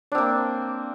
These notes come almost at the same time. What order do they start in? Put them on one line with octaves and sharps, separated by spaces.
D4 C4 A#3